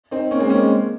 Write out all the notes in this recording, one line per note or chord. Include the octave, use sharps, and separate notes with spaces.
C4 D#4
A#3 C#4
G#3 C4
A#3 C#4
G#3